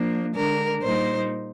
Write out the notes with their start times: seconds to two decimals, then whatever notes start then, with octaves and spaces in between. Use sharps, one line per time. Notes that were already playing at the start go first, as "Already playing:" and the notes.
Already playing: F3 A#3 D4
0.35 D3 G#3 D4 A#4
0.82 A#2 G3 A#3 D#4 C5